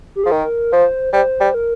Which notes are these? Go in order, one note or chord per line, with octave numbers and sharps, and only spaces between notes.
G4
F3 G#4
D#3 A#4
F3 C5
G3 C5
G3
A#4